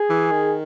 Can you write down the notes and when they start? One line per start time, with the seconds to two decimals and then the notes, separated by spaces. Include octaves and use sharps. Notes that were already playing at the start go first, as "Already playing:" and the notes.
Already playing: G#4
0.10 E3
0.31 D#3